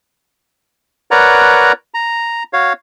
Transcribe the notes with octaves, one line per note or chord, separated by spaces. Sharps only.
A#4 B4 C#5 D5 F#5 A#5
A#5
F#4 C#5 F5